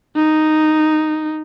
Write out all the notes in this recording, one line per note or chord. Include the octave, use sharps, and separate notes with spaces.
D#4